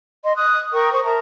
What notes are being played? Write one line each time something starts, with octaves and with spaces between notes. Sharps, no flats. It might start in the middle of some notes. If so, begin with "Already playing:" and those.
D#5 C6
D#6 F#6
A#4 G5 C#6 D#6
C5 C#6 D#6
A#4 E5 A5 A#5